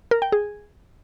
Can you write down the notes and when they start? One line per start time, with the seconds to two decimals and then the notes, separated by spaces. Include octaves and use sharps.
0.11 A#4
0.22 G5
0.32 G#4